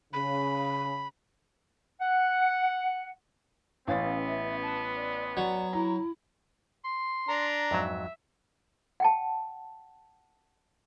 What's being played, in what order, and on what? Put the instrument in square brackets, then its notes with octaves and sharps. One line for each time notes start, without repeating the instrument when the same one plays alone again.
[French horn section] C#3 [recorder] B5
[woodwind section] F#5
[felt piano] A1 C#4 A6 [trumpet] B3 [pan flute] F5
[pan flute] E5
A5
D5
[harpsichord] F#3 [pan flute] D5
[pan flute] E4 [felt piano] A#5
[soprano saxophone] C6
[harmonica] D4 [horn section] A#5
[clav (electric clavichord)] F2 G#2 F#3 [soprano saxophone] E5
[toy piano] F#5 G5 A5